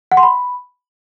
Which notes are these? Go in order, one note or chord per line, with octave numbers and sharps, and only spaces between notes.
F#5
C6
B5